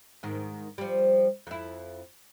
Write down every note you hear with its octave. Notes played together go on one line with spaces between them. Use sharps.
G#2 D#3
F3 G3
F2 E4